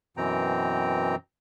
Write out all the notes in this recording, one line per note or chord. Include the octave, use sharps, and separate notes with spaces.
F#2 B2 E3 C4 G5 A#5